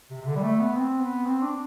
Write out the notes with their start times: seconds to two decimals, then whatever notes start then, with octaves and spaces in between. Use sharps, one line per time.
0.10 C3
0.21 C3
0.27 D3
0.36 G3
0.43 A3
0.60 B3
0.77 C4
1.01 B3
1.26 C4
1.42 D4